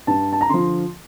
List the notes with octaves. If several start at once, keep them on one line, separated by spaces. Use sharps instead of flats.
G2 A5
A5
A#5
D3 F3 C6